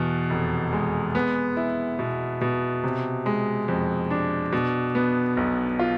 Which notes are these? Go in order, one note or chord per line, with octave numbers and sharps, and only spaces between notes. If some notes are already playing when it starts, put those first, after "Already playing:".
Already playing: E2 B2
F1
G#3
B3
E4
B2
B2
C3
G#3
F2
D4
B2
B3
B1
F4